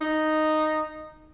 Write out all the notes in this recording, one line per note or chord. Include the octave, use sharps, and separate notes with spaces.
D#4